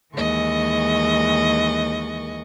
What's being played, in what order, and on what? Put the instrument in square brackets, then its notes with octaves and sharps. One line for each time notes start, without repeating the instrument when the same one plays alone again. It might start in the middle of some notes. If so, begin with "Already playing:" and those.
[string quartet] D#2 E3 G#3 D#5 C#6